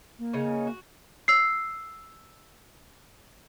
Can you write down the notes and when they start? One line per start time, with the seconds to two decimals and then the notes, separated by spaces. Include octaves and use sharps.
0.19 A#3
0.33 C#3 D#4 C#5
0.67 F#4
1.28 E6 C7